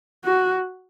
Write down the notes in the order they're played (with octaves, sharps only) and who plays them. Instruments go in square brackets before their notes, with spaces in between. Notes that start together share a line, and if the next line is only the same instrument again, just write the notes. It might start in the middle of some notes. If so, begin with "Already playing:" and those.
[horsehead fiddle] F#4